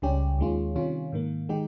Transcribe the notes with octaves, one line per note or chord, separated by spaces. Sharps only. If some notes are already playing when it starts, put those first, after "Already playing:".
C#2 C#3 G3 C#4 G4
D#2 D#3 G#3 C#4 F4
C3 D#3 G3 C#4 F4
G#2 D#3 A#3
D#3 G#3 D#4 G4